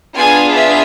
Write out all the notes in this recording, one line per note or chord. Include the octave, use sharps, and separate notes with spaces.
B3 D4 F4 G#4 G#5
E5